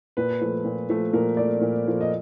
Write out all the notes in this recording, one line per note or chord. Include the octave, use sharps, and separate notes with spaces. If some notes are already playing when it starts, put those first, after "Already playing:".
A#2 B4
F3 A3
A#2
F3 A3
A#2 A#4
F3 A3 D5
A#2
F3 A3
D#5